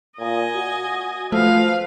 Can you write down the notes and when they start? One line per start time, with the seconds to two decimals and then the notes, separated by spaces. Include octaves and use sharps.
0.19 A#2 D#5 G#5
0.55 F#4
1.32 F3 A3 B4 F5